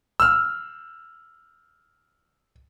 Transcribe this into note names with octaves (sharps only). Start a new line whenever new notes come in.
E6 F6